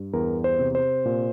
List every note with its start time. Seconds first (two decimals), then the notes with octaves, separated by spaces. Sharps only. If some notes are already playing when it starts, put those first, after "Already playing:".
Already playing: G2
0.13 E2 A#4
0.44 C5
0.59 C3
0.75 C5
1.05 A#2